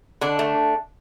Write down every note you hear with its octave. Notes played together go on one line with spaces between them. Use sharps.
D3 D4
A3